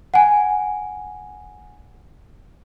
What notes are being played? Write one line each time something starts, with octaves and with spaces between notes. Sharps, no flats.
F#5 G#5